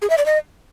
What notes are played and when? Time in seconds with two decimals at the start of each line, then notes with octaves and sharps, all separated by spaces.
0.02 G#4
0.10 E5
0.18 D5
0.26 D#5